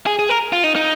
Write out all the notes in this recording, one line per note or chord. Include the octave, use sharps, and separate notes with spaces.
G#4
G#4
A#4
F4
D#4
D#4